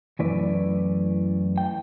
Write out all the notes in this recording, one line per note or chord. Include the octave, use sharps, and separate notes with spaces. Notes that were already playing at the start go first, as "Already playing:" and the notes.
F#2 E3 A3 E4 B4 D5
G5